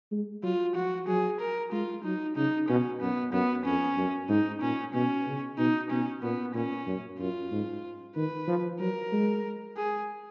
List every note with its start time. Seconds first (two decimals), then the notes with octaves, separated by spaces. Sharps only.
0.12 G#3
0.43 F#3 F4
0.76 F3 F#4
1.08 F#3 G#4
1.40 A#4
1.72 G#3 F4
2.04 F#3 D#4
2.36 C#3 D#4
2.68 B2 C#4
3.01 F#2 B3
3.33 F#2 B3
3.65 F2 C#4
3.97 F#2
4.29 G#2 D#4
4.61 A#2 C#4
4.94 B2 C#4
5.27 C#3
5.58 B2 D#4
5.90 B2 C#4
6.22 A#2 B3
6.55 A#2 C#4
6.87 F#2
7.19 F#2 F4
7.51 G#2
8.16 D#3 B4
8.48 F3
8.80 F#3 A#4
9.12 G#3
9.77 G#4